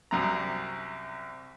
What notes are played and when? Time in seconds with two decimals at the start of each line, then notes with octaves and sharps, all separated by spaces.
0.11 C2 F#2 A#5